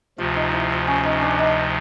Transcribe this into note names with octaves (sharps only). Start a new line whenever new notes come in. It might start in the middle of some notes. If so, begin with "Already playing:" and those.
D2 C3 F3 F4
D#4
E4
F4
C#4
D#4
D4
D#4